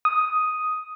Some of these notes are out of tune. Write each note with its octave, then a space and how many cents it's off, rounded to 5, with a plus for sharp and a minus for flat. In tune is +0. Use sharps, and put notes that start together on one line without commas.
D#6 +5